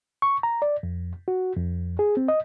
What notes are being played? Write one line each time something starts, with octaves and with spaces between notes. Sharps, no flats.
C#6
A#5
D5
F2
F#4
F2
G#4
C4
D#5